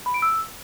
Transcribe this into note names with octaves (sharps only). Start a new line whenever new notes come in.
B5
D7
E6